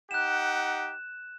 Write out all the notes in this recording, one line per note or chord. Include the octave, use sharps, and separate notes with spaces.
D#4 G4 F#5 F#6 E7